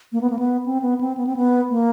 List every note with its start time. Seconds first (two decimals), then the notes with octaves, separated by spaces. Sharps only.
0.12 A#3
0.21 B3
0.30 A#3
0.39 B3
0.66 C4
0.82 B3
1.01 C4
1.17 B3
1.27 C4
1.37 B3
1.70 A#3